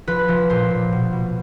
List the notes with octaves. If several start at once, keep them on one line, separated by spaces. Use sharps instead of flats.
F3 B4
F3
A#2 C5
A#2
B2
B2